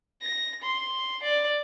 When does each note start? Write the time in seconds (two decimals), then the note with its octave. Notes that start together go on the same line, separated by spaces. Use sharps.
0.22 A#6
0.63 C6
1.24 D5